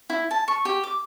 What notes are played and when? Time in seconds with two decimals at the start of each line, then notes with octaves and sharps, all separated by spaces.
0.10 E4
0.31 A5
0.48 C#6
0.65 G4
0.83 D6